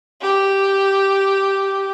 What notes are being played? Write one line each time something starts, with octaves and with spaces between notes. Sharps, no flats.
G4